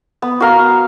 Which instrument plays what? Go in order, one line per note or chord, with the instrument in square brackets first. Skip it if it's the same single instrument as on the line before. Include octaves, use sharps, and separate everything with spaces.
[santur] B3
F#4 A#4 F5
B3